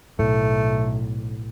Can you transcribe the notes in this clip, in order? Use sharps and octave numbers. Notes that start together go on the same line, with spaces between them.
B1 A2 A3